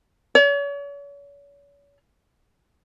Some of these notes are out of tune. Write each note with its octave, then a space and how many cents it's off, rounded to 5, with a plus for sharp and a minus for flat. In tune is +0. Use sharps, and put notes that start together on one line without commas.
C#5 +40